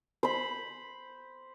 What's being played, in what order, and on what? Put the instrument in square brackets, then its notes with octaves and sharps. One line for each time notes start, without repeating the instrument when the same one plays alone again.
[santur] C5 B5